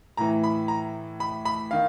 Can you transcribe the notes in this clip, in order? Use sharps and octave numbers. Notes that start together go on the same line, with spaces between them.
A2 E3 A#5
B5
A#5
B5
B5
D#3 F5